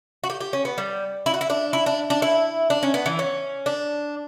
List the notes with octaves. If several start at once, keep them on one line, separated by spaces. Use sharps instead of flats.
F#4
G4
G4
C#4
B3
G3
E4
F#4
E4
D4
E4
D4
D4
E4
D4
C#4
B3
E3
C#4
D4